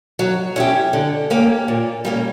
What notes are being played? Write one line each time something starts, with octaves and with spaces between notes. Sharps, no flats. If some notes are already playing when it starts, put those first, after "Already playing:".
F#3
C#4 E4 G4
D3
A#3 C#4 G4
A#2
G3 A#3 C#4